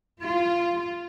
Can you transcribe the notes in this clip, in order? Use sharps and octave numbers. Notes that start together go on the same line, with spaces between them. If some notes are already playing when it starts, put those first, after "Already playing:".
F4